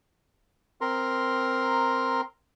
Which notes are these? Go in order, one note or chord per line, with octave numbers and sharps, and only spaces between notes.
C4 A#4 A#5 C6